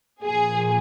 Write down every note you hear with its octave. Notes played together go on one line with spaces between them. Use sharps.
A#2 F3 G#4